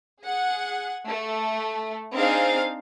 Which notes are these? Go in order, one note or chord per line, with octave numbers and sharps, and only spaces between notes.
G#4 F#5
A3
C4 D4 D#4 G#4 C5 F5